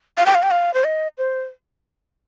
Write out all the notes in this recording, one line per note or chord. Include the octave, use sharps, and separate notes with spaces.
F5
G5
F5
G5
F5
C5
D#5
C5